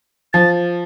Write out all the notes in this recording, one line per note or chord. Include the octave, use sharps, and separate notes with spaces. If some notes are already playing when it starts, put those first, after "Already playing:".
F3 A6